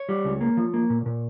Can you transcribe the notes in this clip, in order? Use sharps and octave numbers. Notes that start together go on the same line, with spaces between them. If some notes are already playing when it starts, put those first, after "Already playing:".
Already playing: C#5
G3
C#2
A#3
F3
A#3
A#2
A#2